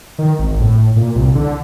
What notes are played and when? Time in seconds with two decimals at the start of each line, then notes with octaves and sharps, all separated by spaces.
0.19 D#3
0.39 G#1
0.60 A2
0.96 A#2
1.15 C2
1.35 D3